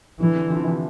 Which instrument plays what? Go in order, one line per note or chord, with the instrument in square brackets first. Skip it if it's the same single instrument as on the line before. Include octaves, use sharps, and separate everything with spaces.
[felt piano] D3 [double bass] E3
[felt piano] D3
D3 F3
D3
C3 E3